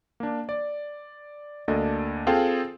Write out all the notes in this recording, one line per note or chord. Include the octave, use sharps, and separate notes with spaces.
A#3 D4
D5
D2 A#3 D4 A4 D#5
C4 F4 G#4 A4 F5 G5